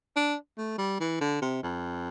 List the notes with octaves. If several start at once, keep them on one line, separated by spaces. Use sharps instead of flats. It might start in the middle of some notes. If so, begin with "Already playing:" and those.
D4
A3
G3
E3
D3
C3
F2